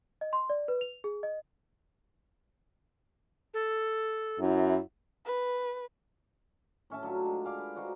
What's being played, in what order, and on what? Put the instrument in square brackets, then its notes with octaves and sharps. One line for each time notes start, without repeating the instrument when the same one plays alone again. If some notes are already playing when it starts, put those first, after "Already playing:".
[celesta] D#5
C6
D5
B4
F7
G#4
D#5
[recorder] A4
[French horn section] F#2 E4
[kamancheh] B4
[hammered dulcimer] A2 C#4 E5 A5
F#3 D4 F4 G4
G#3
D5 F5 G#5
B4
D#4 F#4 C5 D5